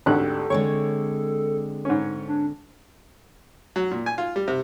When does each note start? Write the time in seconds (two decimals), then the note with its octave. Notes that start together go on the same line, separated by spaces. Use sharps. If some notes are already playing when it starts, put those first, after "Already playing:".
0.06 G#1 D2 G4 A4 F#6
0.50 D3 G#3 C4 C#5
1.85 G#2 C#4
2.28 D4
3.76 F#3
3.91 A#2
4.06 G#5
4.18 F4
4.36 G3
4.48 C3